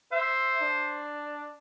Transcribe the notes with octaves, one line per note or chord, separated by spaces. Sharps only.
C5 E5
D4